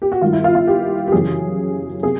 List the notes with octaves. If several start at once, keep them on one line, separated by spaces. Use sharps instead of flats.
G4
F#4
G2 D#3 F4
E4
F4
F4
G4
G4
F#2 C#3 E3 G#4
C3 G#4